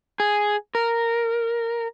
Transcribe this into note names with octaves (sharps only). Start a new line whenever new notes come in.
G#4
A#4